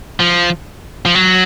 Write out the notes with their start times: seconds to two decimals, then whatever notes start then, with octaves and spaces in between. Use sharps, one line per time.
0.20 F3
1.05 F3
1.15 F#3